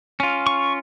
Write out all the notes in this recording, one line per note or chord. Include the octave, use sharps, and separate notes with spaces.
C#4 F4
C#6